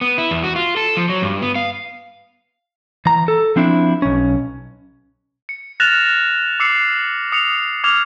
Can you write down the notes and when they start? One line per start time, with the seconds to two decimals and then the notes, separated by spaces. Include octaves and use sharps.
0.01 B3
0.18 E4
0.31 E2
0.44 F#4
0.56 F4
0.77 A4
0.97 F3
1.09 F#3
1.22 G2
1.42 B3
1.55 F5
3.06 E3 A#5
3.28 A4
3.56 F3 C4 D4 E4
4.02 B1 C#4
5.49 C#7
5.80 F6 F#6 A6 A#6 E7 F7
6.60 D6 E6 C7 C#7
7.32 D#6 C#7 F7
7.84 D6 F6 G#6 F7